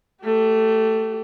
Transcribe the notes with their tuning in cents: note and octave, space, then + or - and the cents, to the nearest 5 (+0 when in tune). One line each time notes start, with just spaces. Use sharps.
A3 +10 G4 -25